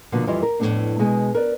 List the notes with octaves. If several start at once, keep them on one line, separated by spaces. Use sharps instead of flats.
B2 D3 F3 A#3 F#4
F2 E3 G3 E4 F4 D#5
A#4
F2 A2 F#3 A3 B3 D4
B2 G#3 G#4 G#5
A#4 B4 D5